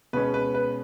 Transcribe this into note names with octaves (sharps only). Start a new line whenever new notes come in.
B2 G#3 C#4 B4
B4
B4